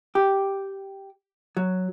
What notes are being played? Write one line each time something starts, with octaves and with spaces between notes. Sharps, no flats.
G4
F#3